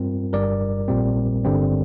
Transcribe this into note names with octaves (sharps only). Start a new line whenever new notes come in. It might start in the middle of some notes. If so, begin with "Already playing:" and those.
Already playing: G2 G3 C4 F4 A#4
G1 G2 G3 A#4 D5
A#1 A#2 G3 C4
G1 G2 D3 G3 C4